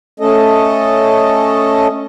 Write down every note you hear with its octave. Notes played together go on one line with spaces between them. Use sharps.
A3 C#4 A4 D#5